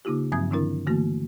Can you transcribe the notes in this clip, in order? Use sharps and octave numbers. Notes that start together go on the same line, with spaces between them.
C#3 A#3 D#4 F4 G4
G2 F3 F#3 C4 D#6 G#6
D3 D#3 C4 D4 E4 A#4
D3 E3 A3 A#3 F#4